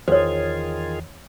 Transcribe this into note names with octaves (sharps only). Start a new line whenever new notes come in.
E2 D#3 F4 G#4 C5 C#5